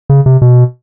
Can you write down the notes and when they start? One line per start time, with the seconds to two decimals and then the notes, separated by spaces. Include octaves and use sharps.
0.10 C#3
0.26 C3
0.42 B2